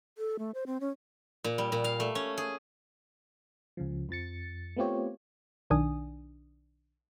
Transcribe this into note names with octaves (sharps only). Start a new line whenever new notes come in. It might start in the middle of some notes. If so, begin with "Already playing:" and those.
A4
A3
C5
C4
C#4
A#2
G3
A#2
F5
A3
C#4
G#4
C#2 C#3 F3
F2 F3 A6 C#7
A3 B3 C4 F4 G4 C#5
B1 D#3 D4 G#5 D#6